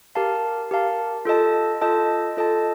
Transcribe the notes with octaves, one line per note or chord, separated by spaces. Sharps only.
G4 A#4 F5 A5
G4 A#4 F5 A5
F4 A4 D#5 A5
F4 A4 D#5 A5
F4 A4 D#5 A5